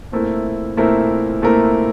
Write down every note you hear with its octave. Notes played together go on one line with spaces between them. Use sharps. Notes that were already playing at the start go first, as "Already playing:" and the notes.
A#2 A3 C4 E4 A#4
A#2 A3 C4 E4 A#4
A#2 A3 C4 E4 A#4